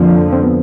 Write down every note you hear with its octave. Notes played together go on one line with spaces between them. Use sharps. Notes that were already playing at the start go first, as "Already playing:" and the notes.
Already playing: F2 D3 F3 A#3 C4
C4
B3